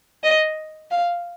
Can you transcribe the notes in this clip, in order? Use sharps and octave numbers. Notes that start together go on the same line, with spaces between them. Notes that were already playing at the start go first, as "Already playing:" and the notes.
D#5
F5